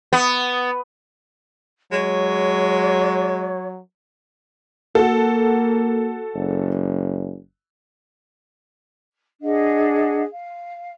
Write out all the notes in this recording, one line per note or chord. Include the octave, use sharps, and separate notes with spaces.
B3
F#3 G#3 C#5
A#3 F#4 A4
F#1
D4 G#4 D#5 F#5
F5